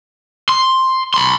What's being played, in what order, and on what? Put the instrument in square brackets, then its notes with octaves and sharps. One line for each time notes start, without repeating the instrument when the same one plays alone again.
[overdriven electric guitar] C6
B5 C6